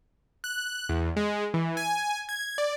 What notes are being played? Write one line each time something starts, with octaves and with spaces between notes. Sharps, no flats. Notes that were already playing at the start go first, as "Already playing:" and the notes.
F#6
E2
G#3
E3
G#5
G#6
D5